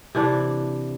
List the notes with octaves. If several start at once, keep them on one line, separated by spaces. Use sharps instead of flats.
C3 E3 D4